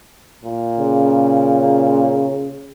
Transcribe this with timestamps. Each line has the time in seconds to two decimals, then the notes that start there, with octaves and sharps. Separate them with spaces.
0.45 A#2
0.79 C#3